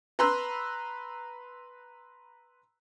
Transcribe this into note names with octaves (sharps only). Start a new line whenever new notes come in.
B4 A#5 C6 E6 F#6